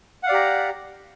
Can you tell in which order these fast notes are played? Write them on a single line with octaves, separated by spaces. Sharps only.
F#5 F5 D5 G4 A#5